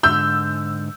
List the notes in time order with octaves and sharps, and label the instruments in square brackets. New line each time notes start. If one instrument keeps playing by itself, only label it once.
[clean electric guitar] G#2 D3 [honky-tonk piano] E6 G6